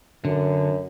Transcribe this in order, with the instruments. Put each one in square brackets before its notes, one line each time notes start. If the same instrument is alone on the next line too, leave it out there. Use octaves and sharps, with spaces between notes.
[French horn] F#2 [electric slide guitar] D3